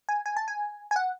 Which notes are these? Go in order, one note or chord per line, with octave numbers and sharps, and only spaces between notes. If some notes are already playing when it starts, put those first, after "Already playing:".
G#5
G#5
A5
G#5
G#5
F#5